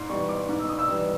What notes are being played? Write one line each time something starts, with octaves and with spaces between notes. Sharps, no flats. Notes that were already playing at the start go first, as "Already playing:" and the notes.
Already playing: G#2 C6
E3 G3 C#6
D6
G#2
E6
D#6
E6
E3 G3